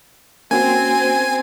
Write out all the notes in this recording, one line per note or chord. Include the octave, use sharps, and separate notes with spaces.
A#3 C4 C#4 F#4 G#5